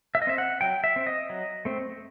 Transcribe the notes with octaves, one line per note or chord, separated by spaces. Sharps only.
E5
D#5
C4 E5
F#5
F#3 G5
E5
C4
D#5
F#3
A3 C4